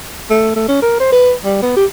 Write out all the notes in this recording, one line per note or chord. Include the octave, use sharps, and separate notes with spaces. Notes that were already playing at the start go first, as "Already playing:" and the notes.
A3
A3
C#4
A#4
C5
B4
G3
B3
G4